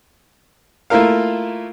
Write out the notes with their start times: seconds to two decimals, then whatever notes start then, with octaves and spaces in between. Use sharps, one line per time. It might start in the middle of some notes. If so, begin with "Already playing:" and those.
0.90 A3 A#3 E4 F4 A#4 F5